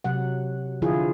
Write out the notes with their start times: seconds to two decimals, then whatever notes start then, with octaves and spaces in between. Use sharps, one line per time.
0.04 C3 F#3 F#5
0.82 D3 F3 E4 F4 G#4